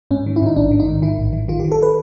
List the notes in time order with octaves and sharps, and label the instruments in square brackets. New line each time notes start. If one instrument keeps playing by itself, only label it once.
[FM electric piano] G#2 C#4
D#3
E4
G#2 D#4
A1 D4
D#3
D#4
G#2
D#3 E4
A1
D#3
D#3 F4
G4
D#3
A4
B4